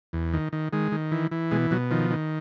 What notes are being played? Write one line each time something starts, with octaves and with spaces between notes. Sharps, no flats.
E2
D#3
D#3
D#3 G#3
D#3
E3
E3
B2 G#3
B2 F#3
D#3 F3
D#3